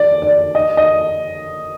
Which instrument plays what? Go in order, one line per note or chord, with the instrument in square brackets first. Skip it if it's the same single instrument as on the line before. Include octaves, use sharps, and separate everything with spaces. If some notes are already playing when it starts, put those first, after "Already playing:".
Already playing: [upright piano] D5
D5
D#5
D#5